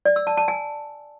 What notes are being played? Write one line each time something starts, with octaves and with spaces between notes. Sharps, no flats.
D5
E6
A5
A5
G#5